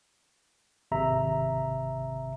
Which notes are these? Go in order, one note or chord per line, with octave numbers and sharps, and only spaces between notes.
G#1 C3 E5 A#5